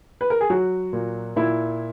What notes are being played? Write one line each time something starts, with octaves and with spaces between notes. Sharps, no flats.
B4
A#4
G#4
F#3 F#4
A#2
A#2 E4